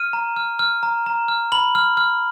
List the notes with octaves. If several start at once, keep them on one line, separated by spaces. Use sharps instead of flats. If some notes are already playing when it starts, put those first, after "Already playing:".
Already playing: F6 D#7
A#5
F6
F6
A#5
A#5
F6
B5 F#7
F6
F6